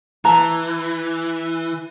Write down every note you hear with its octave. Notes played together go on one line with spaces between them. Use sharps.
E3 A5 A#5